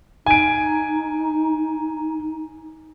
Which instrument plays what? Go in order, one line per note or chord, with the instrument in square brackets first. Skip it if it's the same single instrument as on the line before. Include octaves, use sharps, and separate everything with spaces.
[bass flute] D#4 [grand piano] G#5 D7